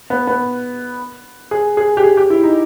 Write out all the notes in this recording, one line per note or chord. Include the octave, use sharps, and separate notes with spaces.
B3
B3
G#4
G#4
G4
G#4
G4
E4
D#4